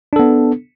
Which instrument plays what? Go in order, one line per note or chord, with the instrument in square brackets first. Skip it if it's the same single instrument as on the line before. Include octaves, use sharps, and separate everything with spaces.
[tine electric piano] D4
A4
B3